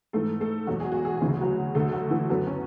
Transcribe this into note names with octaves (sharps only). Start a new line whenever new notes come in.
G#2 E3 A3 A4
A3 A4
E2 B2 F#3 F#4
G#4
F#4
G#4
F#4
D2 C#3 E3
G#4
F#3 F#4
D2 D3 F#3 A3 A4
F#3 F#4
E3 E4
F#2 D3 F#3 B3
C#4